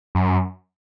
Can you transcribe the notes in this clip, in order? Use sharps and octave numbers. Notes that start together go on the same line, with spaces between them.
F#2